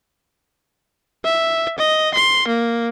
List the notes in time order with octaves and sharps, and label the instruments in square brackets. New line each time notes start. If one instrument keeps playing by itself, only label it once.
[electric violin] E5
D#5
C6
A#3